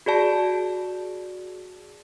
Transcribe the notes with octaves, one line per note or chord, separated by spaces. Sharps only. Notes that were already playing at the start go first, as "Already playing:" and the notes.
F#4 G#4 D5 A5